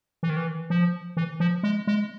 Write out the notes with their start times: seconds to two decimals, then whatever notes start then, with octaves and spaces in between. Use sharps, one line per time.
0.23 E3
0.30 D#3
0.37 E3
0.70 F3
1.17 E3
1.40 F3
1.63 G#3
1.87 G#3